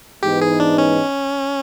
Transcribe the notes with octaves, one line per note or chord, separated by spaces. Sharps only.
G#2 E3 G#3 B3 D#4 G4
G#4
D4
C#4